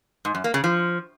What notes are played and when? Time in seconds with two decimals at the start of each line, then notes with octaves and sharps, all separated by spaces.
0.25 G#2
0.35 F#2
0.44 A#3
0.54 C#3
0.64 F3